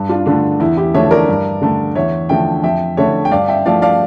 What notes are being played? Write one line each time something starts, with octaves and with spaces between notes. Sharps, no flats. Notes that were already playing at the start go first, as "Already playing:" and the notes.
Already playing: G2
D4 F4
D3 A3 D4
E2 E4
E4 G4
D3 F3 A3 C#5 E5
A#4 D5
G2
D3 A3
E2 C#5 E5
D3 F3 A3 E5 G5
F2 E5 G5
D3 A3 C#5 E5
G5
G2 D5 F5
E5 G5
F3 A3 D5 F5
D5 F5